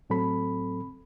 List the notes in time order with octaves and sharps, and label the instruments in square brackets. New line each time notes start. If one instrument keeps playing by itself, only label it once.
[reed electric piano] A2 F#3 C4 A4 B5